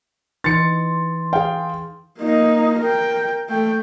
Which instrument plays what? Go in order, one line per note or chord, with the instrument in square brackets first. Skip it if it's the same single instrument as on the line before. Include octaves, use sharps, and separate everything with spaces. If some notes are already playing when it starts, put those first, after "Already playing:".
[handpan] E3 D#4 [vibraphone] C6 [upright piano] A6 C#7
[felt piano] G#4 F5 [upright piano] G5
[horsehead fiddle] A#3 D#4
A#4 G5
A3 G5